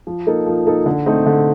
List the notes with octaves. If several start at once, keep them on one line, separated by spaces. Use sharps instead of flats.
F3
A#3 D#4 A4
F3
A#3 D#4 A4
D3
A3 C4 D#4
D3